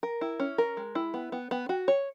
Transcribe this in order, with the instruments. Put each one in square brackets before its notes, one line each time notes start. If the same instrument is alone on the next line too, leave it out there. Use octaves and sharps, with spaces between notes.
[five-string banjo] A#4
E4
C#4
A#4
G#3
E4
B3
B3
B3
F#4
C#5